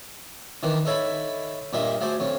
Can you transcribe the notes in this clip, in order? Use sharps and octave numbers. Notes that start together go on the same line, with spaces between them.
D#3 E3 D4 D#4
D#4 A4 C#5 E5 B5
G2 A#2 A#3 A#4 D#5 E5
F#3 A3 G#4 C5 D5
F2 C#4